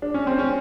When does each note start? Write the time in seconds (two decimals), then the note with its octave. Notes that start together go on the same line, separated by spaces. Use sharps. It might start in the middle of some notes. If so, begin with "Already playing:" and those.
0.02 D4
0.14 C#4
0.27 C4
0.39 C#4